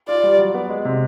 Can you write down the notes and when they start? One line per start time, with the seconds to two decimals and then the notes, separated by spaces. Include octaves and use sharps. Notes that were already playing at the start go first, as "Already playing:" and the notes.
0.08 F4 D5
0.23 G3
0.39 F#3
0.54 B3
0.69 G#3
0.85 C3